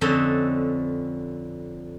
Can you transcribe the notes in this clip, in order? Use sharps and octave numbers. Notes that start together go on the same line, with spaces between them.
F2 D3 C4 C#4 A4 D#5